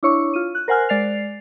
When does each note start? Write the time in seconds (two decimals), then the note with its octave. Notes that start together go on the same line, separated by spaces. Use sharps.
0.03 D4 E4 C#5 C#6
0.34 F4 D#7
0.55 F#6
0.68 A#4 C5 F#5 G#5 F6 F#6
0.89 G#3 D5 A6 C7 F7